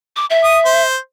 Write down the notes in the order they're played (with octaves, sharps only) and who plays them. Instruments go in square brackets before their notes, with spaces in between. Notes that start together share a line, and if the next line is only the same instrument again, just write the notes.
[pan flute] D6
E5
[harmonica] D#6
C5